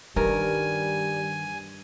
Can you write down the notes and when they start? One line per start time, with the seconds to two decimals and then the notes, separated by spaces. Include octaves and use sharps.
0.16 G2 D#3 G3 A#4 G#5